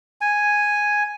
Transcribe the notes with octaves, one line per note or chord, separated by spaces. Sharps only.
G#5